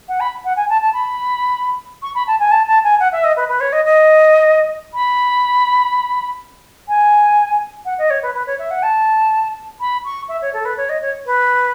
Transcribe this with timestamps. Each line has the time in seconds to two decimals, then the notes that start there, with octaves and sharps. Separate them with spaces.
0.08 F#5
0.20 B5
0.44 F#5
0.56 G#5
0.69 A5
0.81 A5
0.93 B5
2.02 C#6
2.15 B5
2.27 A5
2.39 G#5
2.51 A5
2.67 A5
2.84 G#5
2.99 F#5
3.12 E5
3.24 D#5
3.36 B4
3.48 B4
3.60 C#5
3.72 D#5
3.85 D#5
4.94 B5
6.88 G#5
7.85 F#5
7.98 D#5
8.10 C#5
8.22 B4
8.34 B4
8.46 C#5
8.59 E5
8.70 F#5
8.82 A5
9.80 B5
10.04 C#6
10.28 E5
10.41 C#5
10.53 A4
10.65 B4
10.77 C#5
10.89 D#5
11.02 C#5
11.26 B4